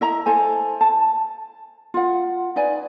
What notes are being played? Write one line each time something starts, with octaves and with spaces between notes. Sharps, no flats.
E4 D#5 A#5
E4 A4 C5 G#5
A5
F4 F#5
D#4 B4 D5 G#5